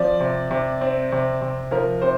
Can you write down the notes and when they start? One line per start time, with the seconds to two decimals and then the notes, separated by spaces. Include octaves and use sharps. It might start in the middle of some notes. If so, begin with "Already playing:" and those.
Already playing: F3 C4 D5
0.20 C3
0.51 C3
0.81 C4
1.12 C3
1.41 C3
1.71 F3 A#4
2.01 C3 C5